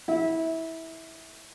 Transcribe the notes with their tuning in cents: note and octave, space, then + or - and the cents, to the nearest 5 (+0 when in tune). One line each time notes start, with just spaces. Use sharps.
E4 -20